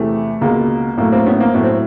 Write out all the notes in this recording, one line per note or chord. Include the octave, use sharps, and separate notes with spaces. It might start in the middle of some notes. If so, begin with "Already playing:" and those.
Already playing: E2 C3 E3 A3
C#2 B2 G#3 A#3
A2 F#3 A3 A#3
A#3 C4
B3 C#4
A#3 C4
A2 F#3 A3 B3
C4